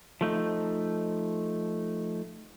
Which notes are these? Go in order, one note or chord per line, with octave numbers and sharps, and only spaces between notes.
F3 A3 D#4